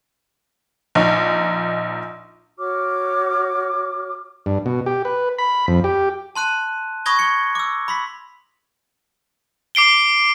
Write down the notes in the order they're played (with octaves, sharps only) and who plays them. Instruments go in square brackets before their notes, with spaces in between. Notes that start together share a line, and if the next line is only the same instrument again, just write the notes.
[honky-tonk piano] A#1 D#4
[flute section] F#4 C#5 D6 F6
[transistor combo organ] G2
B2
G4
B4
B5
F2
G4
[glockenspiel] A5 C6 F#6 D#7
B5 C#6 D#6 G#6 A#6 G7
C#6 G#6 C#7
D6 E6
B5 C6 B6
[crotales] D6 C7 D7 G7